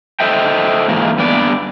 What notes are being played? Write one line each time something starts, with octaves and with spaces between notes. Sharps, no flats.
A4 C5 D#5 E5 G5
G#2 E3 A#3
G2 B3 D5